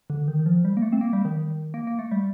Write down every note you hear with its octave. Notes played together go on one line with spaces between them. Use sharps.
D3
D#3
D#3
F3
G3
A#3
A3
C4
A#3
G3
D#3
A#3
A#3
A3
G3